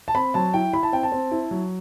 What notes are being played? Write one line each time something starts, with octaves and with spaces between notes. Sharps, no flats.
A5
C4 B5
F#3 A5
E4 G5
E4 B5
A5
C4 G5
A5
C4
E4
F#3